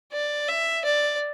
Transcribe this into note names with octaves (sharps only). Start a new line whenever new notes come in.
D5
E5
D5